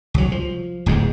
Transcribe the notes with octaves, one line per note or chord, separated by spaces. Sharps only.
C2 F#3
F3
D1 E2 G#3